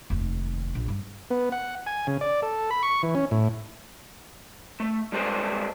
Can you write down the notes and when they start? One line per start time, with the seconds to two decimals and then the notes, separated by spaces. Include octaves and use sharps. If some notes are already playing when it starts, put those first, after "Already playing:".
0.10 F1 D#2
0.75 A#1
0.88 G2
1.31 B3
1.52 F#5
1.86 G#5
2.07 C#3
2.21 D5
2.42 A4
2.71 B5
2.83 C#6
3.03 E3
3.15 C#4
3.31 A2
4.80 A3
5.12 G3 G#3 G4 A4 B4 C5